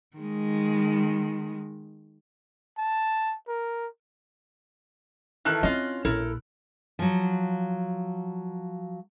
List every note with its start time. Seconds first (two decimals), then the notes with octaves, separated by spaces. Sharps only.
0.16 D#3 G#3
2.78 A5
3.48 A#4
5.45 D#3 E3 A4 A5 F6 F#6
5.63 C4 C#4 E4 F4 D#5
6.05 A#1 E4 A4 A#4
6.99 F3 F#3